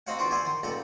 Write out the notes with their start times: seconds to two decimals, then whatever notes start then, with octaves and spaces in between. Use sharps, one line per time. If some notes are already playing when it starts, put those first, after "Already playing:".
0.07 C4 D#4 F#4 C#5 F5 F#5
0.18 E2 D4 F4 F#4 C6 D6
0.31 C5 D5 E5 F#5 G#5 C6
0.45 D#3 C6
0.63 C#2 A#2 G3 A4 F#5